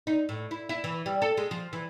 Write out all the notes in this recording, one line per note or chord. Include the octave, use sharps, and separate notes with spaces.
D#4
A2
E4
E4
E3
G3
A4
G#3
F3
E3